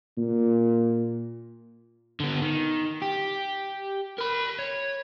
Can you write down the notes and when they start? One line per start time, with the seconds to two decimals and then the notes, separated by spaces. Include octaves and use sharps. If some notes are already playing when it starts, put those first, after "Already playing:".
0.17 A#2
2.20 D3 B3
2.42 D#3
3.02 G4
4.19 A#4 B5
4.59 C#5